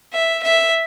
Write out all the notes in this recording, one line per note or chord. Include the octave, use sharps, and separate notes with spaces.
E5
E5